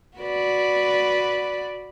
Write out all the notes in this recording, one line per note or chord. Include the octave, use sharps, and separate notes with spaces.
F#4 B4 D5